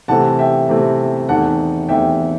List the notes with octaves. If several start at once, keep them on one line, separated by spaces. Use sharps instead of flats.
C3 E3 A3 C4 F#5 A5
E5 G5
C3 E3 A3 C4
E2 D#3 A3 C4 F#5 A5
E2 D#3 A3 C4 E5 G5